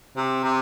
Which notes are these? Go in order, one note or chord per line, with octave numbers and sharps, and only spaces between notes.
C3
C3